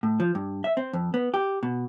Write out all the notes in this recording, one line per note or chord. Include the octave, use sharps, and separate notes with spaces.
A2
F3
G2
E5
C4
F2
B3
G4
B2